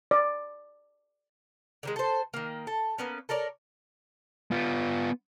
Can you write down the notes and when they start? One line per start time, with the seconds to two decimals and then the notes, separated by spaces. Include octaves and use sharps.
0.11 D5
1.83 D3 D#3 G#3
1.96 A4 C5
2.34 D#3 A#3
2.67 A4
2.98 A#3 B3 C#4
3.29 A4 A#4 C#5 D5
4.51 B3 F4